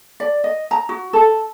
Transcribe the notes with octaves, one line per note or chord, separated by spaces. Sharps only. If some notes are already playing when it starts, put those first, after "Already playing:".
D5
D#5
A#5
F#4
A4